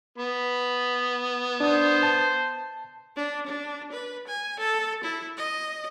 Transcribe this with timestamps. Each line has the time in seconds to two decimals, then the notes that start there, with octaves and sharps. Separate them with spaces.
0.18 B3 B5
1.60 D4 C5 D#6
2.03 A5
3.16 D4
3.47 D4
3.92 B4
4.27 G#5
4.60 A4
5.04 E4
5.37 D#5